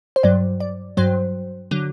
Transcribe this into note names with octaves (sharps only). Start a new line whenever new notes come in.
C5
G2 F#3 D5
D5
G2 F#3 C5
D3 F#3